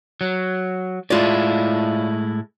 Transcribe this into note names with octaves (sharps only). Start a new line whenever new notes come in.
F#3
A2 G#3 E4 F4 D5